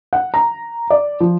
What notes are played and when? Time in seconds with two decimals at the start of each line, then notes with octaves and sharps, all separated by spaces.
0.13 F#5
0.34 A#5
0.90 D5
1.20 F3